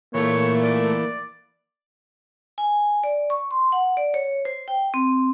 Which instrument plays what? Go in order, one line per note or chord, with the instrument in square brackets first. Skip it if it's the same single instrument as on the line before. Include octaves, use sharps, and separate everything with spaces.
[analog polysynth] A#2 A3 [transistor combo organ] E3 [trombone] A#3 [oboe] C#5
[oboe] D5
[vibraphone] G#5
D5
C#6
C6
F#5
D5
C#5
C5
G5
C4